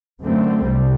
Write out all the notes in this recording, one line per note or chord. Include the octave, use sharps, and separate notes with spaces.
F#2 D3 A3 C4
C2 C3 G3